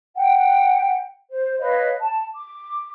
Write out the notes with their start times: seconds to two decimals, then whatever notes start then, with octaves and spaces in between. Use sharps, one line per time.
0.15 F#5 G5
1.31 C5
1.59 B4 C#5 D#5 F5
1.99 A5
2.34 D6